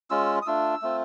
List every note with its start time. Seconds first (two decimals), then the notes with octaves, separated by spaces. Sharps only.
0.10 G#3 C#4 F4 E6
0.42 D#6
0.46 A3 D4 F4 E6
0.82 A3 C4 F4